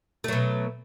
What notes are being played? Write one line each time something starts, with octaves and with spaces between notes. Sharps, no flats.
B2 F#3 A3